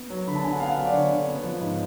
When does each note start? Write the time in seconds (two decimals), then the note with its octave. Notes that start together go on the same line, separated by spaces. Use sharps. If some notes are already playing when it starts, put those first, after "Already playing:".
Already playing: B3
0.10 F#3
0.27 D3 B5
0.35 A5
0.44 D3 G#5
0.52 F#5
0.60 B3 F5
0.69 F#5
0.77 F#3 F5
0.86 D5
0.93 D3 C#5
1.11 D3
1.27 B3
1.44 F3
1.61 G#2